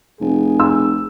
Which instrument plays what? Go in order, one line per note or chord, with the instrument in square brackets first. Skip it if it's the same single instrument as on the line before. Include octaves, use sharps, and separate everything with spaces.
[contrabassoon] F1 [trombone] G#4
[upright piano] E6